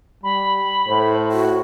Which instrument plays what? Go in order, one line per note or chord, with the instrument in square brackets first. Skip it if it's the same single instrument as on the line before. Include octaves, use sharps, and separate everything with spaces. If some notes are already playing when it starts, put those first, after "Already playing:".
[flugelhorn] G3 [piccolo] B5
[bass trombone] A2 [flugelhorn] C5
[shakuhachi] F#4